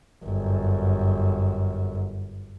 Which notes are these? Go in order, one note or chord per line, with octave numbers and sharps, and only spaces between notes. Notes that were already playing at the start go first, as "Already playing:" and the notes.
G1 F#2